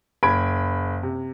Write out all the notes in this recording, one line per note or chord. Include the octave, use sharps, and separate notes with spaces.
F#1 B5 G#6 D7
C3